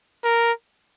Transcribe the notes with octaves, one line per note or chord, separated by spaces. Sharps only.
A#4